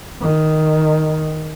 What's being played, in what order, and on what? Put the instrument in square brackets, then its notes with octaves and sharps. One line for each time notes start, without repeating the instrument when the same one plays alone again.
[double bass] D#3